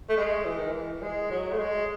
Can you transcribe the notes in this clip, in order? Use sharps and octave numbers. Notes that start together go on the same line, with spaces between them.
A3
G#3
E3
D#3
E3
G#3
F#3
A3
G#3